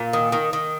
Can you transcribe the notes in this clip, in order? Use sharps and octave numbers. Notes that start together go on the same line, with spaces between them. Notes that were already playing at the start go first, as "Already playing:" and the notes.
Already playing: A#2
D#3
D#3
D#3